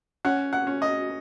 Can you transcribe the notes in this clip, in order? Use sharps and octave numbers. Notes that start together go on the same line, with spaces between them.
C#4 F#5
F#5
C#4
D#5